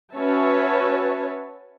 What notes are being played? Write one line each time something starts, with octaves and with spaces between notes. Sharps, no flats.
C#4 F#4 B4 C#5 E5 A5